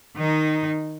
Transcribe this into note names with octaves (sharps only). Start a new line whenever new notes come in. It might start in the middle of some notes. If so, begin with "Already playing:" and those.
D#3 D#4